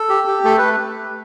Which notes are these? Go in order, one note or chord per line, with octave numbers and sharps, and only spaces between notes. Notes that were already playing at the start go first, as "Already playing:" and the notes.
Already playing: A4
G4
G4
A3 A4
A3 B4